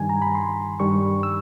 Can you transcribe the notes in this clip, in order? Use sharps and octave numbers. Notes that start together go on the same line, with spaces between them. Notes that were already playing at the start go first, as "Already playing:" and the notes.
Already playing: G2 D#3 G3 G#5
A#5
B5
C6
G2 D#3 G3 C#6
E6